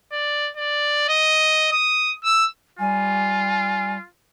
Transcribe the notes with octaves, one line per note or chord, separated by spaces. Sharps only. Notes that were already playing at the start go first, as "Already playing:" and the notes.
D5
D5
D#5
D#6
E6
G3 F4 G#5